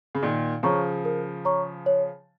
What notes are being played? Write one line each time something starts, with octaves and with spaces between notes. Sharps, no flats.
C#3
A#2 D#3 A#4
C#3 F3 C#5 A#5 C#6
A#4
C#5 A#5 C#6
C#5